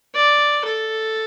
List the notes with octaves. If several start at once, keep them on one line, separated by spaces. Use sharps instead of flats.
D5
A4